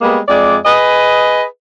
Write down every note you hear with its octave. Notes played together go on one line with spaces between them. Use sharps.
G3 G#3 A#3 B3
F2 G#3 D5
G#4 B4 D#5